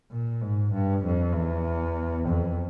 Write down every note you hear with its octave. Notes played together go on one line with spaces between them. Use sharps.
A#2
G#2
G2
F2
E2
F2